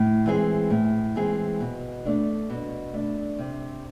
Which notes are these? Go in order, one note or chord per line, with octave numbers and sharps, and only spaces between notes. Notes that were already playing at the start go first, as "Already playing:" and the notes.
Already playing: A2
E3 G#3 C4 G#4
A2
E3 G#3 C4 G#4
B2
A3 D4
B2
A3 D4
C3